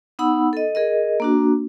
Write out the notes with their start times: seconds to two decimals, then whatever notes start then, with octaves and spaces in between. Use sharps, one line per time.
0.19 B3 D#4 F#5 B5 E6
0.53 A4 D#5
0.75 G#4 A#4 D#5
1.20 A#3 D4 F#4